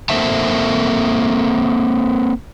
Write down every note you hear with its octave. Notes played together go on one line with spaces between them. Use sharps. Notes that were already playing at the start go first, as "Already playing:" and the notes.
A#3 C4 A4 C5 E5 A5